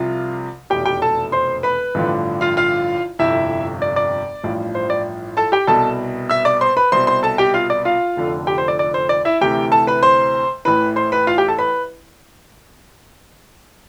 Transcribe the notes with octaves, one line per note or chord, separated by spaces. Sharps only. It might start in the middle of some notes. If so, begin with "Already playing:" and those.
Already playing: C2 C3 F3 F4
F1 E2 B2 G4 G5
G4 G5
A4 A5
C5 C6
B4 B5
A1 G2 D3 F3
F4 F5
F4 F5
G1 F2 C3 E4 E5
D5
D5
A1 G2 F3
C5
D5
A4 A5
G4 G5
C2 B2 A4 A5
E5 E6
D5 D6
C5 C6
B4 B5
C2 B2 C5 C6
C5 C6
A4 A5
G4 G5
F4 F5
D5
F4 F5
F1 F2 D3 F3
G4 G5
C5
D5
D5
C5
D5
E4 E5
D2 C3 E3 G4 G5
A4 A5
B4 B5
C5 C6
A1 A2 E3 B4 B5
C5 C6
B4 B5
F4 F5
G4 G5
A4 A5
B4 B5